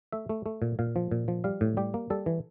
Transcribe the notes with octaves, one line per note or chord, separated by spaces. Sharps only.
A3 E5
A3
A3
A#2
A#2 F5
F3
A#2
F3
G3 F5
A2
G3 G4
A#3
G3 A4
E3